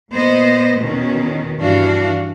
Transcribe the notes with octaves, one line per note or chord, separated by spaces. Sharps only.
A#2 B3 C5 D#5
E2 B2 D#3 C#4
G2 E3 D4 F#4 F5